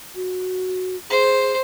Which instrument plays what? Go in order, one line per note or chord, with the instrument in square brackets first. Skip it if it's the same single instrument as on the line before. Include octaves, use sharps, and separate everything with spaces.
[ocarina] F#4
[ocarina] G#4 [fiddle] C5